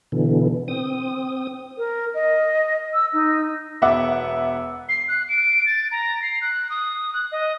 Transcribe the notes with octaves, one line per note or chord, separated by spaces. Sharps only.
B2 D3 E3
C4 D#6
A#4
D#5
E6
D#4
E1 B3 E5 F#5 D6
C7
F#6
D7
A6
A#5
C7
F#6
D#6
F#6
D#5